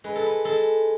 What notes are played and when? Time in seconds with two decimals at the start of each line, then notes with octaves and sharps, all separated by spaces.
0.04 G#3 B4
0.16 A4
0.26 B4
0.44 G#3 A4